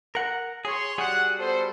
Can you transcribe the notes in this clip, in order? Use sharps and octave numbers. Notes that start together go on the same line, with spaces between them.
A#4 F#5
G#4 C#5 C6
G3 F#4 G#4 F#5
B3 A4 C5